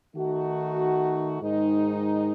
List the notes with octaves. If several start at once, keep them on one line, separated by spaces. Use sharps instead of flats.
D#3 A3 D#4 F#4
G#2 D#3 G#3 D#4